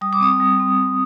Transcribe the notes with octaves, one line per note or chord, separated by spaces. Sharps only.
G3 D#6
D6
C4 D#6
G3
C4
G3